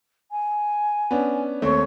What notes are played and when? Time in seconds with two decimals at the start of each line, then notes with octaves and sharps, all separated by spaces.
0.31 G#5
1.11 B3 C#4 D4
1.62 D#2 A3 C4 C#5